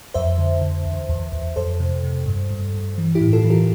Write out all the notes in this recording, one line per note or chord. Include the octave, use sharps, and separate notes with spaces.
F2 C5 E5
D3
D3
E2
E2
E2
F2 A4 C5
C3
C3
G2
G2
G2
E3
E4 G4
A2
F4 A4
E3
G4 A#4